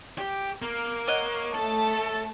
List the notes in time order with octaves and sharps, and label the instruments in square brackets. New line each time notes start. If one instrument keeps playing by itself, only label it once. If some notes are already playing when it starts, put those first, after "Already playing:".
[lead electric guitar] G4
A#3
[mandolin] C#5 D#5 F#5
[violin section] A3 A5 [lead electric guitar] A4